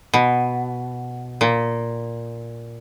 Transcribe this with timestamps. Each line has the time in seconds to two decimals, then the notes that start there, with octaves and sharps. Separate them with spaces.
0.14 B2
1.41 A#2